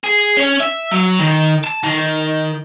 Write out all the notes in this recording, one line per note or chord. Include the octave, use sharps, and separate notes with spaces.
G#4
C#4
E5
F#3
D#3
A5
D#3